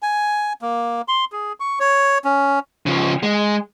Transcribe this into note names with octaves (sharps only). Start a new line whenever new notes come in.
G#5
A#3
C6
G#4
C#6
C#5
C#4
C#3 F3
G#3